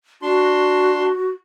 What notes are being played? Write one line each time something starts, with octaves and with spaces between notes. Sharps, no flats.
D4 F#4 C6